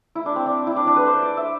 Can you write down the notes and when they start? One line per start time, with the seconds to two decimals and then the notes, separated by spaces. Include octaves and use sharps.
0.15 E4
0.26 D4
0.36 C4
0.46 D4
0.67 E4
0.77 D4
0.87 D4
0.96 B4
1.07 C5
1.22 D5
1.37 E5